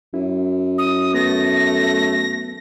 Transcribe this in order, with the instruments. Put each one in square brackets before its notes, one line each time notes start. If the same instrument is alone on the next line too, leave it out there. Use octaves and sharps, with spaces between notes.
[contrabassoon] F#2 [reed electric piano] E4
[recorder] D#6
[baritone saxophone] A3 [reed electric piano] B3 [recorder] A#6